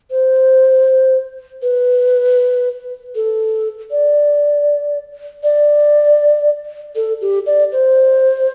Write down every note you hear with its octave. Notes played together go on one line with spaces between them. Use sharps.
C5
B4
A4
D5
D5
A4
G4
D5
C5